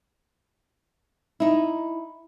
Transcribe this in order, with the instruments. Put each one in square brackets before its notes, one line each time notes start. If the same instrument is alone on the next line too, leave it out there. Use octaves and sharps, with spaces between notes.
[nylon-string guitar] D#4 E4